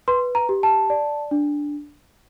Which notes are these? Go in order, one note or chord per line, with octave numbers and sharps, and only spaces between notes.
B4 C6
A#5
G4
A5
D5
D4